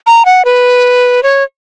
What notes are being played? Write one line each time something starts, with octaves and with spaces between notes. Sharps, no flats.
A#5
F#5
B4
C#5